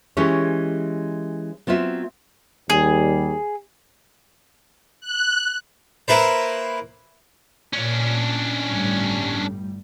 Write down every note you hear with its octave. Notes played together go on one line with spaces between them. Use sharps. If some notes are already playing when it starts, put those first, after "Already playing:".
E3 G#3 C#4 G4 C#5
F#3 B3 C4 F4 E5
D#2 G3 G#4
F#6
A#3 E4 B4 C5
A#2 C#4 D4
G1 A2 G3